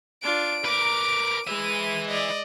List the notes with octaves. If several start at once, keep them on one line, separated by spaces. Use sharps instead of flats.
D4 F4 D7
A#4 B4 D6
G#3 B4 E5 D#7
D5 D#5